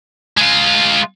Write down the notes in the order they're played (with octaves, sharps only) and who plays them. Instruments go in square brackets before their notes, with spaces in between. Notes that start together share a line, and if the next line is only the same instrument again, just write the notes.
[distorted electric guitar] G#3 F4